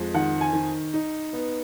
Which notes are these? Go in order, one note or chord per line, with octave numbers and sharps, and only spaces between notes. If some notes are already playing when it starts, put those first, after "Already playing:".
Already playing: F2 G#3
D#3 F#5
G#5
D#3
D#4
B3